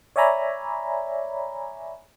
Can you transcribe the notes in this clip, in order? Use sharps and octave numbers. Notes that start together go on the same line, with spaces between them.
C#5 D5 E5 G#5 A#5 B5